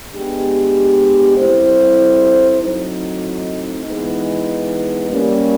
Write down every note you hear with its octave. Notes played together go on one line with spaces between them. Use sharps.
G#3 B3 D4 G4
G3 C4 E4 A4 C5
A2 F#3 A3 C4 D#4
E3 G#3 B3 D#4
G3 A#3 C#4